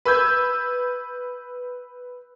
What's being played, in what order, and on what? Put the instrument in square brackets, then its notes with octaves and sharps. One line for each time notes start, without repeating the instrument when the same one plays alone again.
[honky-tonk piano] B4 E6 G6 G#6